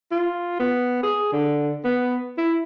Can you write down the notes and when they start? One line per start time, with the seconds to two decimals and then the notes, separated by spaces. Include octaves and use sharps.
0.12 F4
0.60 B3
1.03 G#4
1.32 D3
1.84 B3
2.38 E4